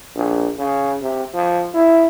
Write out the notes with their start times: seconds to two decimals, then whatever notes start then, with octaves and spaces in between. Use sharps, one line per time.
0.15 A#1
0.58 C#3
1.02 C3
1.34 F3
1.74 E4